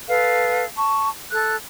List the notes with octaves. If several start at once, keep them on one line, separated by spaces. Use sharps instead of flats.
A4 B4 F5
A5 C#6
A4 F#6